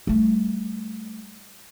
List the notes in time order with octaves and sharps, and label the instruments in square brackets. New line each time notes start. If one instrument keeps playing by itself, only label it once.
[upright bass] G3 A3